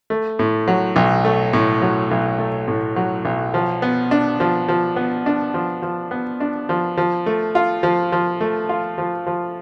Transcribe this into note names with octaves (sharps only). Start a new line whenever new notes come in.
A3
A2
F#3
B1
A3
A2
F#3
B1
A3
A2
F#3
B1
F3
B3
D4
F3
F3
B3
D4
F3
F3
B3
D4
F3
F3
A3
F4
F3
F3
A3
F4
F3
F3